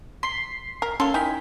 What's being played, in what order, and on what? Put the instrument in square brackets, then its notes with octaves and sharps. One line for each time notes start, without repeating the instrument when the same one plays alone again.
[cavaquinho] C6 [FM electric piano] B6 C7
[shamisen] A#4
[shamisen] A#3 A4 [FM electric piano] C#4 [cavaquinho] C6
[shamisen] D#4 E4 A#4 [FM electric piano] G5 G#5 B6